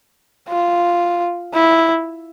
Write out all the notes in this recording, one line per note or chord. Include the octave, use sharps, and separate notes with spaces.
F4
E4